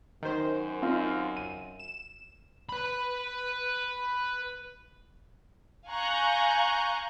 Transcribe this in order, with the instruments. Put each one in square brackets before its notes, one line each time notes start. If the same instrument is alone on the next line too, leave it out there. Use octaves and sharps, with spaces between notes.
[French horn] F#2 [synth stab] D#3 C5
[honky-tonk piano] C4 D#4 F4
D#7
[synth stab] E7
[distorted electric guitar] B4 B5
[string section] F5 G#5 A#5 C#6 F#6 G6